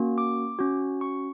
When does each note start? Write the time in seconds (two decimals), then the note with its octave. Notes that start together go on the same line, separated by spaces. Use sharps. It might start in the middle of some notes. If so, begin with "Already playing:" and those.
Already playing: A#3 C#4 F#4
0.18 D6
0.59 C#4 F#4
1.01 C#6